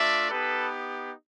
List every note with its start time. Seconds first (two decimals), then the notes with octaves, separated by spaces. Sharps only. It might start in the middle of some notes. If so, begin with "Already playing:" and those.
Already playing: A3 D4 F4 D5 E5
0.30 B3 D#4 G4 A4 B4